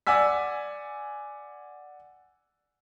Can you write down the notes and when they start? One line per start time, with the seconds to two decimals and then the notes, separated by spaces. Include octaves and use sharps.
0.07 D5 F#5 G#5 E6 B6